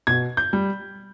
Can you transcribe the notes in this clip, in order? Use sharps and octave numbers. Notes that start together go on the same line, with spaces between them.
B2 G#6
G6
G3